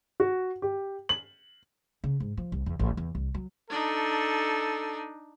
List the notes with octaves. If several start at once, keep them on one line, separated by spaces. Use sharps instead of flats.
F#4
G4
F#7
C#3
G#2
F3
C2
E2
A1
E2
C2
F#3
D4 D#4 A4